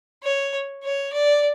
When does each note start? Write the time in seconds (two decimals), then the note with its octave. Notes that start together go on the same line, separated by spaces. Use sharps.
0.23 C#5
0.83 C#5
1.13 D5